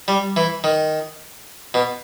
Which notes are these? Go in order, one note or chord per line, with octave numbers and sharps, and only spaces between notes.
G3
E3
D#3
B2